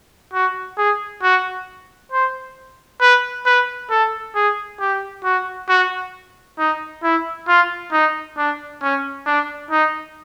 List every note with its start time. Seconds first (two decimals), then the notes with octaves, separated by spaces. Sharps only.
0.33 F#4
0.77 G#4
1.23 F#4
2.12 C5
3.01 B4
3.46 B4
3.90 A4
4.35 G#4
4.80 G4
5.24 F#4
5.69 F#4
6.59 D#4
7.03 E4
7.48 F4
7.92 D#4
8.37 D4
8.82 C#4
9.26 D4
9.71 D#4